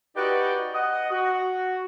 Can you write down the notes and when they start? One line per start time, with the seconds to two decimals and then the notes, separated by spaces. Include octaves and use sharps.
0.16 D#4 F#4 G4 B4 D5 D#5
0.75 D#5 F#5
1.10 F#4